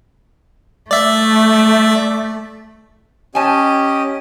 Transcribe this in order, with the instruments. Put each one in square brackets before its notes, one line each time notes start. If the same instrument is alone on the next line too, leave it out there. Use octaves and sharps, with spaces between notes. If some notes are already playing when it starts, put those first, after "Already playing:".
[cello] A3 [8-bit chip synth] D5 E5
[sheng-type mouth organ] C#4 G4 D#5 [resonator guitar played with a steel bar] G#5 A5